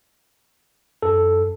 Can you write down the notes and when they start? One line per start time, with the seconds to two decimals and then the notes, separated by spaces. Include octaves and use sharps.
1.02 F#2 A4